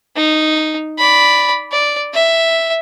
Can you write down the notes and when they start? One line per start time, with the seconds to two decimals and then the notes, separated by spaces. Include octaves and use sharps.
0.16 D#4
0.98 D5 B5
1.72 D5
2.13 E5